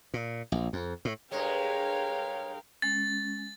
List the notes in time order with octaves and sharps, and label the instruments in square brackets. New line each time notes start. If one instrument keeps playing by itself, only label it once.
[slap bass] A#2
A#1
F2
A2
[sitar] G2 G#3 [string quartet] A#4 F5 G5 [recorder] C#5
[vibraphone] G#3 C#4 [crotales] A6